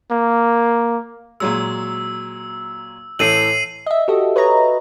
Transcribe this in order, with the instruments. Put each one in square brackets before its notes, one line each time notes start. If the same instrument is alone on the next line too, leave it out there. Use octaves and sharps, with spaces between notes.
[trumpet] A#3
[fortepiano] A#2 F#3 G#3 [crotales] E6
[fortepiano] A2 E3 A4 [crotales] C7 D#7 F#7
[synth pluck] D#5 E5
F#4 G4 A4 D#5
B4 C#5 D#5 A#5